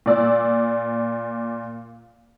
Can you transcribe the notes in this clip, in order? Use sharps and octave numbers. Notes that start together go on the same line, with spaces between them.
A#2 D5 E6